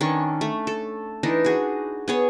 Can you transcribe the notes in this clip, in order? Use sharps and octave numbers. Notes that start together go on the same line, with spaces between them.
D#3 C#4 D4 C#6
A3
A4
E3 D4 D#4
F#4 G#4
B3 G#4 C#5